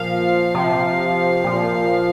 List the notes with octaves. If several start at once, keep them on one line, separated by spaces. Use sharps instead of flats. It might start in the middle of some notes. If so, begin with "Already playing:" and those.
Already playing: A#2 F3 F5
C3 F3
A#2 F3